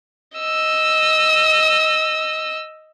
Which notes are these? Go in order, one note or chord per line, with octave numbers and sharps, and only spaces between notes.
D#5 E6